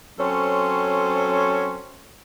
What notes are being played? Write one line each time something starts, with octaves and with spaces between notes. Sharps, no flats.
F#3 C4 C#4 A4 C5 C#5